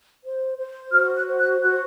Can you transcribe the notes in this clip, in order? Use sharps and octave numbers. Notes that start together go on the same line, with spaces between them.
C5
C5
F#4 F6
F#6
C5
F#6
F#4 F#6